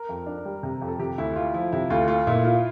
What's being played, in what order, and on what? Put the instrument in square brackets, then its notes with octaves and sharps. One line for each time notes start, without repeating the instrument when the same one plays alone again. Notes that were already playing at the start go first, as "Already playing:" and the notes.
Already playing: [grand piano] A#4
[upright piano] F2
D4
G3
C3
F2
[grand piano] A4
[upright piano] C3 [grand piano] G4
[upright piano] D2 [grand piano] E4
[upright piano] A3 [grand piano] F4
[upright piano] F3 [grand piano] E4
[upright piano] C3 [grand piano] E4
[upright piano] D2 [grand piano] F4
[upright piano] A3 [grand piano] F4
[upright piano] A#2 [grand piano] E4
[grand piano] E4 [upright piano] F4